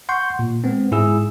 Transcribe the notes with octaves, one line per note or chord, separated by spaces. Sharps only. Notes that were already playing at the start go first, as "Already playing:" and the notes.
F#5 C6 C#6 G6
A#2
G#3 B3 C4
G#2 E4 G#4 E6